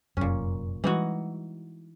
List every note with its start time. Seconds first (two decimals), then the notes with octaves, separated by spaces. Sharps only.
0.17 F1 F#2 A#2 C#4
0.84 E3 G3 G#3 D#4 F#4